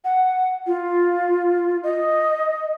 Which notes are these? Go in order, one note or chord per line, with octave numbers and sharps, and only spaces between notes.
F#5
F4
D#5